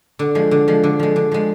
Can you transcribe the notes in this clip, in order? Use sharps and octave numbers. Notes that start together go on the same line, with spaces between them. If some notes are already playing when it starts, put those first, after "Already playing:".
D3
F3 G#3
D3
F3 G#3
D3
F3 G#3
D3
F3 G#3